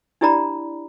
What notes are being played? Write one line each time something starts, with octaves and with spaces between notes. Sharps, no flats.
D4 E4 G4 D5 A#5 B5